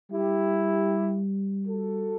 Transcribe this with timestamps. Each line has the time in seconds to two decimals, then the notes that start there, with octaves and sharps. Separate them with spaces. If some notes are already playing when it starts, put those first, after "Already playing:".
0.11 G3 E4 G4
1.66 F#4 A4